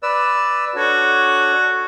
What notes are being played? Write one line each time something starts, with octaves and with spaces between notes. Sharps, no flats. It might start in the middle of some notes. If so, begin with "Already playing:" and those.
B4 D5 E6
D4 F#4 A4 C#5